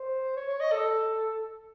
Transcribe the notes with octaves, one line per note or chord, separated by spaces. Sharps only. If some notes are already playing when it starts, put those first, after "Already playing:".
Already playing: C5
C#5
C#5
D#5
A4